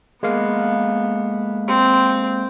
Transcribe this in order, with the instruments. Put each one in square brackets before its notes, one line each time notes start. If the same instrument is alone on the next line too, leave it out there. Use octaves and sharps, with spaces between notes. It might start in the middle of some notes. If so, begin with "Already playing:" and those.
[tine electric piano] G#3 A#3 F5 [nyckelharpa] B3
[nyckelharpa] C4